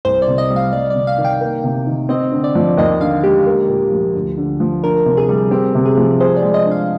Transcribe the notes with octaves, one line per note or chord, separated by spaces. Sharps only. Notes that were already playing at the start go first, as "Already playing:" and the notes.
C2 C5
D5
C3
D#5
G3
F5
G3 D5
D5
C3
F5
D#3
G5
A#3
C3
D#3
C4 D#5
D3
D5
F3
D#2 D#5
D3 F5
G#3 G4
A#3
A#2
F3
D2
D3
F3
D4 A#4
C3
G#4
G3
C4 G4
C3
G#4
F3
G#4 C5
D5
G#3
D#5
D4
F5